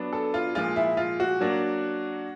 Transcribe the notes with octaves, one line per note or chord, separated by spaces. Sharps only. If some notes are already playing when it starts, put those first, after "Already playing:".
Already playing: F#3 B3 D4
A4
F4
A#2 F3 G#3 F4
E4
F4
F#4
F#3 A#3 D4